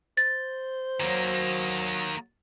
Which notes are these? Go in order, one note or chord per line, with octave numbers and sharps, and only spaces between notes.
C5 A6
D#3 F#3 A#3